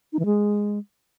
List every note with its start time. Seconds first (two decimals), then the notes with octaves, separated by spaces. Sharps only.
0.13 D#4
0.19 E3
0.26 G#3